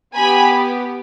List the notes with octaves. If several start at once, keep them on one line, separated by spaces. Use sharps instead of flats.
B3 G4 G#5 B5